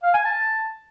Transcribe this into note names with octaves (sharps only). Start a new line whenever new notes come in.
F5
G#5
A5